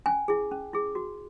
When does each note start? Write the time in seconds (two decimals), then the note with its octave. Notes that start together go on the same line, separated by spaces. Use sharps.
0.06 C#4 G#5
0.28 E4 G#4
0.52 C#4
0.73 E4 G#4
0.95 F#4